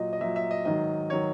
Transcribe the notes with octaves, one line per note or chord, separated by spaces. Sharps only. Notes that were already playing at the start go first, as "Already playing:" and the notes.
Already playing: A#2 F#3 D#5
D#5
A#2 F#3 E5
E5
D#5
G#2 D#3 F#3 D#5
D#3 F#3 C#5